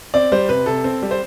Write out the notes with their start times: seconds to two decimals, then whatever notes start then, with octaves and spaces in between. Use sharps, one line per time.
0.14 C4 D5
0.32 G3 C5
0.49 C3 B4
0.66 C3 A4
0.84 C4
1.02 G3
1.11 C5